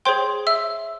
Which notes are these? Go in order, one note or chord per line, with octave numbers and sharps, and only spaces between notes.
G#4 C5 C#5 G5 C6
E5 E6